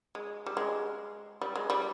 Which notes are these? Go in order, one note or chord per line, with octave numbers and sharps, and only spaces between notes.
G#3
G3
G#3
G3
G#3
G3